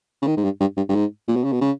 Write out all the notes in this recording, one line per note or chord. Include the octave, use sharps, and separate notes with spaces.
C#3
D#3
G#2
G2
G2
G2
G2
G#2
A#2
B2
C#3
B2
C#3